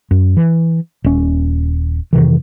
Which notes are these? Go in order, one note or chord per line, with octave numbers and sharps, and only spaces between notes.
F#2
E3
D#1 C#4
F2 C3 D#3 E3